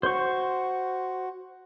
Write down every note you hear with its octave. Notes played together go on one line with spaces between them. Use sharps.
F#4 C5 C#6